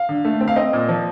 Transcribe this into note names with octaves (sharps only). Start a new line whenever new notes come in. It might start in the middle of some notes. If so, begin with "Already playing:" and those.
Already playing: F5
D3
A3
C4
F5
C4 D#5
A#2
F3